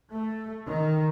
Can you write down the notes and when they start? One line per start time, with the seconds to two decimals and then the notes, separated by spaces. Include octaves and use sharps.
0.11 A3
0.67 D#3